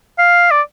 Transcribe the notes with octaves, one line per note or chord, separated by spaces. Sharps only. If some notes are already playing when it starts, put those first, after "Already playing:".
F5
D5